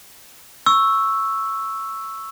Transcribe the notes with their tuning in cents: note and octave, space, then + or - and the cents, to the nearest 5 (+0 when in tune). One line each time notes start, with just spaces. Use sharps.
C#6 -5 E6 +0